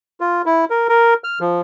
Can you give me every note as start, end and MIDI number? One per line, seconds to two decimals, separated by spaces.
0.20 0.42 65
0.46 0.65 64
0.70 0.88 70
0.89 1.14 70
1.24 1.39 89
1.40 1.61 53